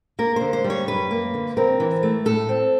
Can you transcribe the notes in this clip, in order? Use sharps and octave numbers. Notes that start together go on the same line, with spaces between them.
A#3 A#4
D3 C5
C5
G3
C#5
F#2 B4
A#3
D3
C4 A#4
E3
A3
A2 A4
C4